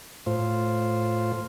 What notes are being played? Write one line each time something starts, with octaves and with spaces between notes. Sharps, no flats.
A2 F4 C5